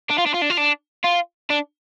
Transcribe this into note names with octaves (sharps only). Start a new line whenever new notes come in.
D4
F4
D4
F4
D4
F4
D4
F4
D4